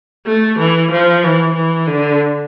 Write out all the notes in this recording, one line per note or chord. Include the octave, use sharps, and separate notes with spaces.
A3
E3
F3
E3
E3
D3